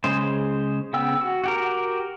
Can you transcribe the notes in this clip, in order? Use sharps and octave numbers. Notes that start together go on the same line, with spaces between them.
C#3 G#3 C5
C#3 B3 G5 E6
F#4
F#4 G4 A#4